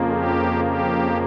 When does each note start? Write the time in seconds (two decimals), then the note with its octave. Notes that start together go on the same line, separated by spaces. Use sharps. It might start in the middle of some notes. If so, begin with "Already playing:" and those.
Already playing: F2 C#3 F3 A#3
0.12 G4
0.64 G4